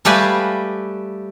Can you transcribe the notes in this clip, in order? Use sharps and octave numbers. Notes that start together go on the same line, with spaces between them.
G3 A3 G4 B4 F5 G#5